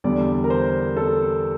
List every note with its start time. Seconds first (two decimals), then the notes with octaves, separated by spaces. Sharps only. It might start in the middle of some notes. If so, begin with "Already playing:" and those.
0.04 E2 D3 G3 D5
0.44 A#4
0.50 C5
0.97 A4